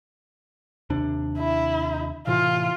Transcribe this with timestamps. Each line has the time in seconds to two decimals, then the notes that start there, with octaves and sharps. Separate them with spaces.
0.90 D#2 C3 D4
1.38 E4
2.27 A2 C3 E3 F4